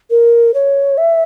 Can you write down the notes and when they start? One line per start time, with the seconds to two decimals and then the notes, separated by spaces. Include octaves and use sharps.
0.10 A#4
0.54 C#5
0.97 E5